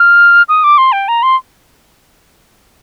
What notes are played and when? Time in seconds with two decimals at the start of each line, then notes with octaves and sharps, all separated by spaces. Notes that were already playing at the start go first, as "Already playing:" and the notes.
Already playing: F6
0.49 D#6
0.64 D6
0.78 C6
0.92 G5
1.08 A#5
1.23 C6